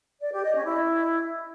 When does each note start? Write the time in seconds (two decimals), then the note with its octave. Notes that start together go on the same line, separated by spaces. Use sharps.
0.21 D5
0.32 G4
0.43 D#5
0.54 C#4
0.65 E4